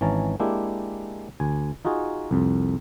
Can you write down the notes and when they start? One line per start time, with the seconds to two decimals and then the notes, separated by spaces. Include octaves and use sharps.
0.01 G#1 E3 C#4 A5 A#5
0.40 G#3 A#3 D4 E4 G4
1.40 D2 G#5
1.85 D#4 F4 F#4 G#4
2.31 C2 F2